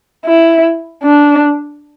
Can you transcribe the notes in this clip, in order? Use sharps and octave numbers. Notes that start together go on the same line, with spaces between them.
E4
D4